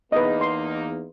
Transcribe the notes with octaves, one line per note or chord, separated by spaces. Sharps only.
E2 A#3 D#4 B4 D#5
C6